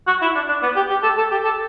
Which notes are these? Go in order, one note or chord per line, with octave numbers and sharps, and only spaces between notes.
F#4
E4
D4
D4
B3
G4
G4
A4
A4
G4
A4